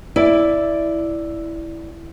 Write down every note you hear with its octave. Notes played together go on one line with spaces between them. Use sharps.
E4 D5